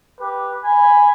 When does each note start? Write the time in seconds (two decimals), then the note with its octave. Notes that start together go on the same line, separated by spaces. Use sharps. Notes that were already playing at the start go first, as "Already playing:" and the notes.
0.19 G4 B4
0.63 G#5 B5